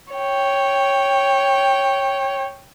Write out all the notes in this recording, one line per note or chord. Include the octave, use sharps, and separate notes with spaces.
C#5 G5